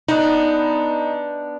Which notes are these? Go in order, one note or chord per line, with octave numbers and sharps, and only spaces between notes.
B3 D4 D#4